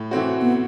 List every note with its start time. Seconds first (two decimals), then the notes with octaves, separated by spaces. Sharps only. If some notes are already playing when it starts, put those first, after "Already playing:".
Already playing: A2
0.11 E3 A3 C4 F#4
0.42 B3